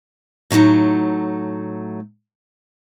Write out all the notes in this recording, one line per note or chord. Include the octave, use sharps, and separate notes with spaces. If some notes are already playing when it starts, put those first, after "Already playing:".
A2 F#3 A3 D#4 F#5